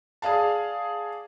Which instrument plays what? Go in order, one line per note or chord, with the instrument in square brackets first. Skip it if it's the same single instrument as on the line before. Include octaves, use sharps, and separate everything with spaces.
[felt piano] G#4 D5 F5 A5